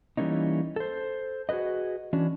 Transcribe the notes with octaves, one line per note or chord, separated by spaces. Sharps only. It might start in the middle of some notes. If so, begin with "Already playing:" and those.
E3 G3 A#3 C#4 D#4
A4 C5
F#4 G#4 A#4 B4 D#5
E3 C#4 D4 F#4